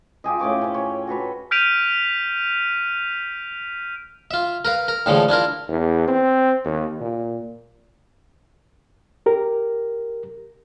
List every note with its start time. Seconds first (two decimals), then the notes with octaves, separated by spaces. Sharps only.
0.24 F4 G4 G#4 D#5
0.40 A2 C#4 C#5 D6
0.61 C#4 C5
0.74 C#5
1.07 F#4 A4 B4 C#5
1.51 F6 G6 B6 D7 D#7 F7
4.31 F4 E5
4.65 A#4 B4 F5
4.88 A#4
5.06 A2 D3 E3 F3 G#3 A3
5.29 D4 E4 F4 A#4
5.68 E2
6.08 C4
6.65 D#2
7.01 A#2
9.26 G4 A#4